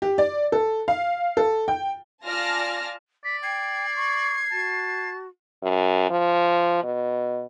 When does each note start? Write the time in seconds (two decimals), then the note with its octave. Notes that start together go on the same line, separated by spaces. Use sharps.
0.02 G4
0.18 D5
0.52 A4
0.88 F5
1.37 A4
1.68 G5
2.24 F4 D5 G#5 A5 F6 A#6
3.24 D5 B6
3.43 G5 G#6 C7
3.95 C#6
4.51 F#4 A5
5.63 F#2
6.10 F3
6.83 B2